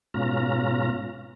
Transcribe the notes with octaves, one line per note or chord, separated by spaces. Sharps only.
G#2 B2 C#4 F4 A#5